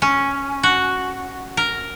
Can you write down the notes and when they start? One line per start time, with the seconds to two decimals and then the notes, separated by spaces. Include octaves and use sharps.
0.02 C#4
0.63 F#4
1.57 A#4